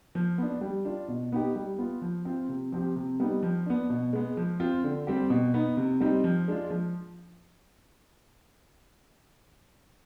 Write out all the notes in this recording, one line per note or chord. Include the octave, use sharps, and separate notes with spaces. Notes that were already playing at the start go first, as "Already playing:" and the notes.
F3
B3 D4
G3
D4 F4
B2
B3 D#4 G4
G3
B3 F4
F3
C4 F4
C3
F3 C4 G4
C3
G3 B3 D#4
F3
B3 D4
B2
G#3 B3
F3
C4 F4
D3
G3 C4 G4
B2
B3 D#4
C3
G3 C4 D#4
F3
G#3 D4 F4
F3